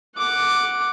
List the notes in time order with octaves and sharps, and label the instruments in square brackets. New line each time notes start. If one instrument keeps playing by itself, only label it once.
[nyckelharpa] F#5 D6